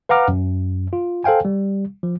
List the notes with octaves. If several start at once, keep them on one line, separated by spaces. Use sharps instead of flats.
B4 F5 F#5 A#5 D6 F6
F#2
F4
A4 C5 F5 G5 G#5
G3
F3